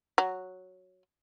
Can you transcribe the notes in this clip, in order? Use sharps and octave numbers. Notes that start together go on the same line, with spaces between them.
F#3